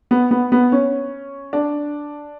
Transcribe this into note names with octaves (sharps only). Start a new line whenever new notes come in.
B3
B3
B3
C#4
D4